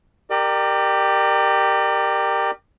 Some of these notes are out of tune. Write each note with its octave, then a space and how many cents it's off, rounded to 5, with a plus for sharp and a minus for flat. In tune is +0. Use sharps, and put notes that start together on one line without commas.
G4 +0 A#4 -15 D5 +40